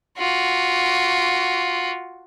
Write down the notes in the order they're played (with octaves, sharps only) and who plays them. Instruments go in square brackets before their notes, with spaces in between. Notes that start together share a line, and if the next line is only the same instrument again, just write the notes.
[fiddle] F4 F#4